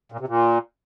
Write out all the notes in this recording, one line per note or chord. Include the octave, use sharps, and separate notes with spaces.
A#2
C3
A#2